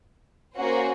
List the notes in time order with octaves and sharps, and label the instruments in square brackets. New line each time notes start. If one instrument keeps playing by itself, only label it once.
[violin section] A#3 C#4 F#4 C5